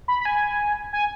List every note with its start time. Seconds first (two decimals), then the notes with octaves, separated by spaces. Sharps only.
0.08 B5
0.21 B5
0.25 G#5
0.93 G#5